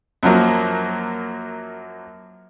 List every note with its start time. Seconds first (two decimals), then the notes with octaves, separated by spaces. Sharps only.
0.23 F#2 F3 F#3 A#3